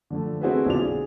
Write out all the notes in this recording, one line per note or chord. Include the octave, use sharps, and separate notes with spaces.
D3 F3 A3
C4 E4 F#4 G#4 A4 B4
B1 D3 F4 D5 F7
G#4